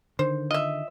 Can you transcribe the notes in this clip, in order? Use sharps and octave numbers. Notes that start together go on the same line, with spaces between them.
D3 D#3 C5
F4 D#5 E5